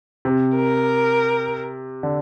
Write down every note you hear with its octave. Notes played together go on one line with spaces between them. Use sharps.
C3
A#4
D3